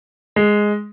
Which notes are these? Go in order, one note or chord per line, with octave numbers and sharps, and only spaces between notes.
G#3